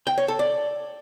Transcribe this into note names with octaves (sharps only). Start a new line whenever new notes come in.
G5
C#5
A4
D5